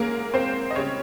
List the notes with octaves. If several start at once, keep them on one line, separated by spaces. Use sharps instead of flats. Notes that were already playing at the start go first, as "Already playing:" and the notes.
Already playing: G#2 A#3 C#4 G#4 A#4
C4 C5
D#5
C#3 G3 C4 C#4 C#5